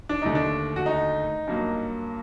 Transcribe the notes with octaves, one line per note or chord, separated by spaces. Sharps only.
D4
D#2 D3 A3 D#4
D4
F#4
D#4
G2 F#3 A#3